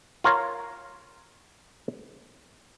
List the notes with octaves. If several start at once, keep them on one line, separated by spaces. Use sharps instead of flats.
F4 A#4 C#5 F5